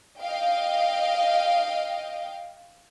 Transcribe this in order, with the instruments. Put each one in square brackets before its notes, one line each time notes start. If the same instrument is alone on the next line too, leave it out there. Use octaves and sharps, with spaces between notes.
[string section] D#5 F5 G5